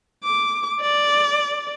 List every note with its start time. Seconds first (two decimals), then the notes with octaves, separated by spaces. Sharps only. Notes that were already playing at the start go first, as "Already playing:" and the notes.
0.24 D6
0.81 D5